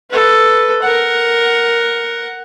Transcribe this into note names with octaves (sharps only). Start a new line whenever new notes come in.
A4 B4
A#4 F#5